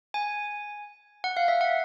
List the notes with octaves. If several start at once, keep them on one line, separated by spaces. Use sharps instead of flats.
G#5
F#5
F5
E5
F#5